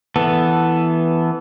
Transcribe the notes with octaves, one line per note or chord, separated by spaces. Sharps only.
E3 B3 A4